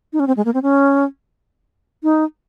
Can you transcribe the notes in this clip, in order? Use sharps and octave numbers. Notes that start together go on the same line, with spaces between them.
D#4
C#4
C4
G#3
A#3
C4
C#4
D#4